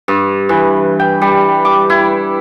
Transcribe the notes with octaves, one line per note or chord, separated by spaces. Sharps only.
G2
E3
G5
G3
D6
E4